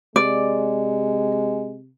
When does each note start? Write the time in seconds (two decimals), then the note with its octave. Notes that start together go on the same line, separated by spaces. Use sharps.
0.16 C3 G#3 D5